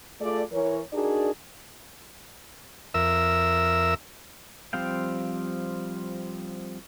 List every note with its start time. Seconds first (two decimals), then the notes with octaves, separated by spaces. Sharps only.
0.20 A3 F4 G#4 A4 D5
0.52 E3 A#4 C#5
0.93 D4 D#4 F#4 G#4 A#4 D5
2.94 F2 A#4 E5 E6
4.73 F3 G3 C4 F5 G5